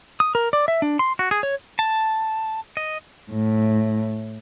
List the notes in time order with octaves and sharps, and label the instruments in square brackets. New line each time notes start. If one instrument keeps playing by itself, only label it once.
[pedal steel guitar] D#6
A#4
D5
E5
D4
C6
F#4
G#4
C#5
A5
D#5
[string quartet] A2